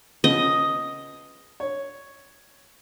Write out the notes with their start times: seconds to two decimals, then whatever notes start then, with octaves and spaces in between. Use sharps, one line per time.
0.24 C#3 F3 B3 D#5
1.60 C#5